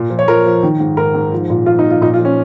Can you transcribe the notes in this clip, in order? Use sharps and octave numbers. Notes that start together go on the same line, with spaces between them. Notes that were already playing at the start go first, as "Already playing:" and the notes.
Already playing: A#2
F3
C#5
F3 A#4
F3
D#3
G#2
G#2 A#4
G#2
F3
A#2
F3 F4
D#4
F3
F4
A#2 D#4
F4
F3
C#4